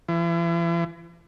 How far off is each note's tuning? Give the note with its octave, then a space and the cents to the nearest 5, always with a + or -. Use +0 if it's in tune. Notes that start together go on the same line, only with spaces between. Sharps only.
E3 +40